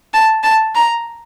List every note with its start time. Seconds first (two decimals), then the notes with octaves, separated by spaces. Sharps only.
0.14 A5
0.44 A5
0.75 A#5